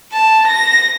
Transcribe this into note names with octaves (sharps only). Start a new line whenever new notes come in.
A5
A#6